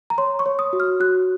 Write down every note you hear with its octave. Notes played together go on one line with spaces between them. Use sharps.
A#5
C#5 C6
C#6
C#5
D#6
F#4
F6
F#4 F#6